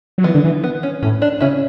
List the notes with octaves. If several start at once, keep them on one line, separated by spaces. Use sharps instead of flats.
F#3
E3 B3
D3
E3
B3
C#4
A2 C#4
D4
C#3 C#4 E4